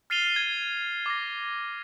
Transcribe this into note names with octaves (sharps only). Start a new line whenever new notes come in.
F6 A6 C7 D#7 F7 G7
G#6 D#7
D6 A#6